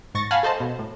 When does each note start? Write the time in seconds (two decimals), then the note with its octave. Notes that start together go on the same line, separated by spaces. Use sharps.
0.15 G#2 C#6 A6 A#6
0.31 F5 F#5 G#5 A5 B5 F6
0.43 A4 C5 D#5 A5
0.60 B2
0.79 A2